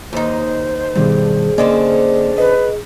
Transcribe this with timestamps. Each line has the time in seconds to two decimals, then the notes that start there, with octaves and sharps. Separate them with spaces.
0.13 D#2 D#4 C5
0.96 G2 B2 D#3 G3 G#4
1.58 D3 A#3 C4 C#4 D5 D#5
2.38 B4 D#5